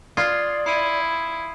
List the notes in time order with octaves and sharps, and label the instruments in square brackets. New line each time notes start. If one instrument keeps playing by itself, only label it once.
[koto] F4 [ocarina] D5 [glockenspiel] D#6 G#6 C7
[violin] E4 [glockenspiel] C7 D#7